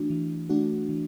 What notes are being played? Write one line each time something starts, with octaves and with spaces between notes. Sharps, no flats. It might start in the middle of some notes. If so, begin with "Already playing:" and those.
Already playing: E3 A3 D4 F#4
E3
A3 D4 F#4
E3